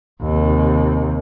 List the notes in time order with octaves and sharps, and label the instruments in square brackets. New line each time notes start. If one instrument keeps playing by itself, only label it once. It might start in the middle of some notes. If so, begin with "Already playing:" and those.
[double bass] D#2 C3